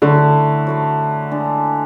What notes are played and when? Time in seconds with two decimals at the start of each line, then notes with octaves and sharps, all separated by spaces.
0.02 D3 F#3 A3 E4
0.67 F#3 A3 E4
1.31 D3 G#3 D4